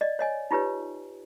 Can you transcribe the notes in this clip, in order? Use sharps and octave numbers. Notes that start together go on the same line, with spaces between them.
D5 D#5
C#5 D#5 G#5
D#4 F4 G4 B4 C#5